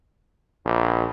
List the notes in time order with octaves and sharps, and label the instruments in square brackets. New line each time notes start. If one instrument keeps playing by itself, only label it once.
[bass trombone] A#1